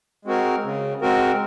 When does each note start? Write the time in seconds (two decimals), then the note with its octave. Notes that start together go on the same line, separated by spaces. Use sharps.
0.25 G#3 C4 F#4 A#4
0.64 C#3
1.01 G#3 C4 F#4 A#4